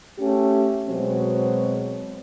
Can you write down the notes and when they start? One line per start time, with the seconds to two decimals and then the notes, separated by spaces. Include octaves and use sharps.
0.19 A3 C#4 G4
0.89 B2 F#3 G#3 C4